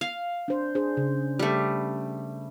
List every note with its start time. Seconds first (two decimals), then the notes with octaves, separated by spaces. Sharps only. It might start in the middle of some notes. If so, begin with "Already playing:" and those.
0.01 F5
0.48 D4 C5
0.75 D4 G#4 C5
0.97 C#3
1.39 G3 A3